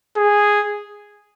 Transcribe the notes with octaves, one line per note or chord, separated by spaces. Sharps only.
G#4